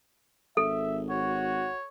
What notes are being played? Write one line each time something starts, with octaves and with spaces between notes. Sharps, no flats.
G#1 A4 E5
F#4 C#5